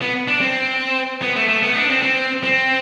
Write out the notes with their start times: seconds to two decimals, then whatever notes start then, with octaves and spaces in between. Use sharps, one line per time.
0.02 B3
0.28 D4
0.41 C4
1.22 B3
1.36 A3
1.48 A3
1.63 B3
1.75 D4
1.90 C4
2.02 C4
2.44 C4